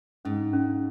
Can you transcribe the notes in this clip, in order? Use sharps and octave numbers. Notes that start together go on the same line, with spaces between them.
G#2 C#4
C#4